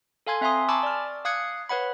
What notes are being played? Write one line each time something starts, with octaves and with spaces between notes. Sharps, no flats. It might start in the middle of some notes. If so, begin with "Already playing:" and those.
A4 F5 G#5 C6 G#6
C4 E5 G#5 A#5 C6 D#6
G#5 A5 B5 C#6 D6 E6
D5 F6
F5 D#6 F#6 G#6 C#7
B4 C#5 F#5 B5